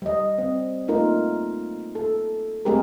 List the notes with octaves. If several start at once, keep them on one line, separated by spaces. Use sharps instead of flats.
G3 D#5
C4
A3 A#3 D#4 F4 A#4
A4
G#3 A3 C4 G4 G#4 A#4